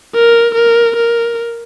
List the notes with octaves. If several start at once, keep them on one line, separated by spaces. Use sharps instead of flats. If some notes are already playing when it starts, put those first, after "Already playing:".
A#4
A#4
A#4